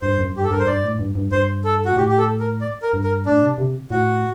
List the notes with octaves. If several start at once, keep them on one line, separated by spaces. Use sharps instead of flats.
G2 C5
F#2
G2 G4
A4
G2 A#4
C5
G2 D5
A2
G2
G2
G2 C5
A4
F#4
A#2
A2 G4
G4
A4
A#4
D5
A#4
G2
A#4
A2 D4
C3
C3
A2 F#4